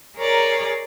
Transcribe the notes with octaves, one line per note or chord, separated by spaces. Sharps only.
G#4 A#4 C#5 D5 A#5